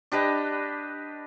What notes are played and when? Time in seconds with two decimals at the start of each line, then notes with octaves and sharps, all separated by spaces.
0.12 D4 G4 B4 D#5